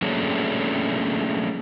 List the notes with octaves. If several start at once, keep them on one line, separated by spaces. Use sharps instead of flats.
F#3 A3 A#3 C#4 D4 G#4